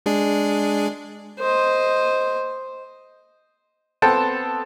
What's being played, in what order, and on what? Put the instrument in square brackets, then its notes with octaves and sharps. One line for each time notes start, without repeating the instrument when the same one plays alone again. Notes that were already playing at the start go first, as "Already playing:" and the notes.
[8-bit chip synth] G#3 D4 G#4
[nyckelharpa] C5 D#5
[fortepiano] B3 C4 A4 G5 A5 C6